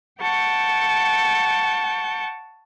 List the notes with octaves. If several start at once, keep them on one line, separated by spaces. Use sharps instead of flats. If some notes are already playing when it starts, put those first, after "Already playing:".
F#5 G5 A5 C#6 G6